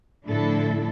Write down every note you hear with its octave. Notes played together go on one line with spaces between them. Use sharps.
A2 D3 F3 D4 E4 A4